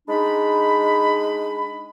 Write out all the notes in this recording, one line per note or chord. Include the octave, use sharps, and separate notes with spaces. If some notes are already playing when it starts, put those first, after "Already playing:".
G#3 D4 D#4 B5